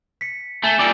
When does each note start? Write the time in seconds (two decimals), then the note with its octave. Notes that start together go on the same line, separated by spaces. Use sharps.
0.21 B6 C#7
0.63 A3 G#5 A6 E7
0.79 A#2 G3 D6 E6 D7